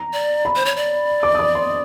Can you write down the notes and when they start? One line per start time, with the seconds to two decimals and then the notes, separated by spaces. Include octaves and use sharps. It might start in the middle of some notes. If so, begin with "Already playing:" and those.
Already playing: A#5
0.13 D5
0.45 B5
0.56 C5
0.65 C#5
0.76 D5
1.23 D6
1.35 D#6
1.39 D6
1.55 C6